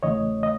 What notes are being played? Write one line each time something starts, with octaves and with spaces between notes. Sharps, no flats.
E2 C#3 E3 A3 C#5 D#5
D#5